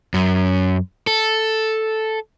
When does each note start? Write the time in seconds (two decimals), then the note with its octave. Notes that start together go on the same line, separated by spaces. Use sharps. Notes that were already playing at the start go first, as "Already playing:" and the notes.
0.14 F#2
1.07 A4